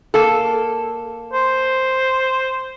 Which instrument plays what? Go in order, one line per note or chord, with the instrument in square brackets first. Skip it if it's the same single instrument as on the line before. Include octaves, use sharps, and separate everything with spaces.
[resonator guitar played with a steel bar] A#3 A4
[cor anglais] C5